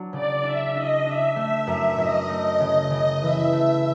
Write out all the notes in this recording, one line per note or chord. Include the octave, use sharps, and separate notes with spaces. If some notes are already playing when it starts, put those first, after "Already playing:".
Already playing: F#3 D4
C#3 D5
D4 E5
D4 D#5
D4 E5
A3 E5
F#2
F#2 D#5
A3
C#3
C#3
E3 E5
A3